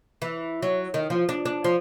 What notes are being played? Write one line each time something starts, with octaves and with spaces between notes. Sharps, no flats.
E3
F#3
D#3
F3
D4
D4
F3